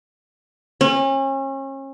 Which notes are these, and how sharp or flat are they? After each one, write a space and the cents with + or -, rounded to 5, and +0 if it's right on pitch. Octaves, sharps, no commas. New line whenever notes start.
C#4 -35